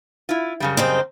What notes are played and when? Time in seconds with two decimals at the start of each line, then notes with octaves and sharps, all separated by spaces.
0.29 E4 F4
0.60 F#2 C#3 G3
0.77 C4 D#4 C5